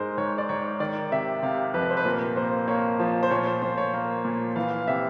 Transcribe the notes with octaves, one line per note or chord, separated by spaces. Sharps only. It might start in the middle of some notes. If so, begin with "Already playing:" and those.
Already playing: G#2 G#3 A#4 C5
G#2 C#5
D5
G#2 C#5
D#3 D5
C3 E5
C3 F5
F2 B4
C5
B4
A#2 A#4
A#3 C5
A#3 C#5
F3
C5
A#2 C#5
C5
A#2 C5
C#5
A#3
A#2
E3 F5
F5
C3 E5